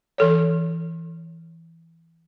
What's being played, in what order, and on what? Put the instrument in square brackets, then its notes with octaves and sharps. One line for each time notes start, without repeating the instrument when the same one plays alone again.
[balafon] E3 A4 C#5